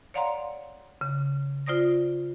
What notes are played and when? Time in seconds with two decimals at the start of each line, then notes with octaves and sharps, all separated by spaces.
0.14 C#5 D5 F5 F#5 A#5 C6
1.01 C#3
1.66 F4 C5 D5 D#6 A#6